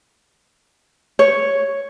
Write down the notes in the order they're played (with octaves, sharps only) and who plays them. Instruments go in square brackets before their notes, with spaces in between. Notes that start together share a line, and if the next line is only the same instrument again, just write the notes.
[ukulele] C#5